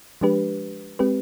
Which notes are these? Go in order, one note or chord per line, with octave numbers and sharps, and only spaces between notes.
F3 G#3 D4 G4 B4
G#3 C4 G4 B4